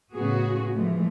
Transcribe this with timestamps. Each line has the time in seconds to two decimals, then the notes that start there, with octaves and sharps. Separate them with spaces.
0.14 A2 C#3 B3 F#4 G#4
0.74 E3 F3 G#3 A3